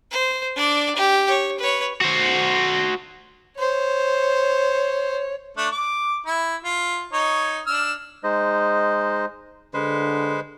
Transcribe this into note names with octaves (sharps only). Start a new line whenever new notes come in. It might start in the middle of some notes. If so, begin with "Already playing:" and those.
C5
D4 D5
G4
C#5
B4 C#5
F#4 C5
C5 C#5
A3 D4
D6
E4
F4
D#4 C#5
D4 E6 F6
G#3 D#4 C5 D#5
D3 G#3 B4 C5